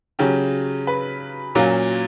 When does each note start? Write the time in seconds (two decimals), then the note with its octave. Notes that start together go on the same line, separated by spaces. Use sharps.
0.19 C#3 F#3 C#4 G4
0.87 B4
1.55 A#2 F#3 A#3 C#4